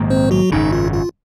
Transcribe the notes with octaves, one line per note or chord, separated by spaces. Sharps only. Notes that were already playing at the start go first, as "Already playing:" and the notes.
Already playing: A#1 G#2 D#3 A#3
C4 C5
F#3 F#4
G#1 F#2 C#3 D#4
F4
F4